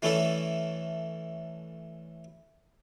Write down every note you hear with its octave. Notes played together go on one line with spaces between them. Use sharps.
E3 A3 C#4 D4 E4 A4